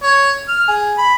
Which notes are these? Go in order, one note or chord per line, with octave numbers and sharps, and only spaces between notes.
C#5
F6
G#4
B5